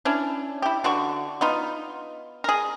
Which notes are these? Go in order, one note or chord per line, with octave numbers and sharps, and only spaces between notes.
C#4 D4 E4
E4 G4
D3 F#4 D5 C#6
B3 D#4 F4
G#4 A#4